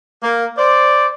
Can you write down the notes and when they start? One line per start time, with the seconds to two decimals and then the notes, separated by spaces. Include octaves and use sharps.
0.23 A#3
0.58 C5 D5